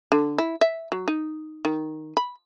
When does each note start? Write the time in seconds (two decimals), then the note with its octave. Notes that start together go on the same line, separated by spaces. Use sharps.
0.12 D3
0.38 E4
0.61 E5
0.92 F#3
1.08 D#4
1.65 D#3
2.17 B5